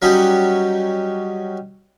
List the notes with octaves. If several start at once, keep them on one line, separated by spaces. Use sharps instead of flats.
F#3 G3 C#4 D#4 F#4 G4